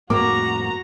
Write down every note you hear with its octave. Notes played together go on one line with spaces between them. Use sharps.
F2 A2 A#3 F#4 A#5 D6